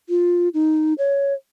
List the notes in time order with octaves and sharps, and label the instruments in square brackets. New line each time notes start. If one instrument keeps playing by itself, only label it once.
[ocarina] F4
D#4
C#5